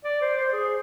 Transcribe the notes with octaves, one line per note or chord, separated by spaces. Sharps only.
D5
C5
C5
G#4